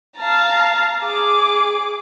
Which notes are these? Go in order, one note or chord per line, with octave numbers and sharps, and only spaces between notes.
F5 A5 A#5
G#4 D6